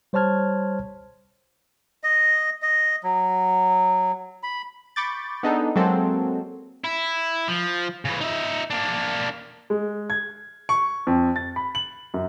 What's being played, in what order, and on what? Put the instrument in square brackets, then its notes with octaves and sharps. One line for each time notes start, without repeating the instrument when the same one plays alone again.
[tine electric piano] G3 C5 C#5 A5 F6 G#6
[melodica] D#5
D#5
F#3
B5
[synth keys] B5 C#6 D6 G6 A6
B3 D4 D#4 G#4 A4
F#3 G#3 A#3 C4 A4
[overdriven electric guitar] E4
F3
C#3 E3
D#4 E5
A#3 D4
[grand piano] G#3
G#6
C#6
F2
A6
B5
F#7
F#2